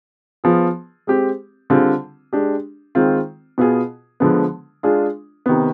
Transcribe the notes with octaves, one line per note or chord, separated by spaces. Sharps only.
F3 B3 F4 G#4
G#3 C4 G4
D3 G3 C4 F4 G#4
G#3 D4 G4
D#3 G#3 C4 F4
B2 B3 F4 G#4
D3 F3 G#3 B3
G#3 D4 F4 G#4
C3 D#3 B3